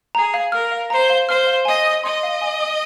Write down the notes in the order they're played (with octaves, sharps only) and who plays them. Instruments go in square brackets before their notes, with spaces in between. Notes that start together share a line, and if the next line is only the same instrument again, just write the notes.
[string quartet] G#4 [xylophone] A#5
[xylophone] F5
[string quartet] A#4 [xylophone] F6
[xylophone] F5
[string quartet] C5 [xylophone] A#5
[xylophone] F5
[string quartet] C5 [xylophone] F6
[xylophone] F5
[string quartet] D#5 [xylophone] G#5
[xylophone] D#6
[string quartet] D#5 [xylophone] C6
[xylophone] F5
G#5
D#6